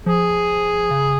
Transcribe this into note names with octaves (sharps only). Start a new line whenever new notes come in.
F3 G#4
C#3